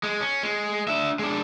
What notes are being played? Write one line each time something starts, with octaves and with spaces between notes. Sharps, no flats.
G#3
C#4
G#3
D4 E5
G#3 D4